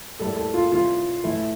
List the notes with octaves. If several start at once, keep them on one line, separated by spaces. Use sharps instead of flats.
A2 G3 A#3 A4
A4
F4
C3 E3 G3 F4
A2 E3 A3 E4